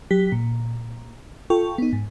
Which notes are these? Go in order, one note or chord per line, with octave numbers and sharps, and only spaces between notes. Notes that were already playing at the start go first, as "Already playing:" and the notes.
F#3 G4 B6
A#2
F4 A4 G5 C#6
B3 D#4
G#2